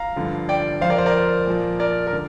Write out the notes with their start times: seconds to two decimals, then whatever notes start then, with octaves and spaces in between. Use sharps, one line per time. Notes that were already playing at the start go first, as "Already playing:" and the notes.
Already playing: F5 A#5
0.16 G2 D3 F3
0.49 D5 G5
0.81 F2 F3 C5 F5
0.90 A#4 D5
0.98 C5
1.06 A#4 D5
1.47 A#2 F3
1.80 A#4 D5
2.07 A#4
2.13 D3